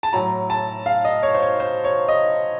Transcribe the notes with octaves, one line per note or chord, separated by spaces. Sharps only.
A5
A2 F#3 A#5
A5
F5
D#5
C#5
C5
C#5
C5
C#5
D#5